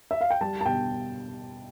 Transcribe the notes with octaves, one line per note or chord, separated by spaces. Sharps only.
E5
F5
G5
G3 A5
A5
B2 G5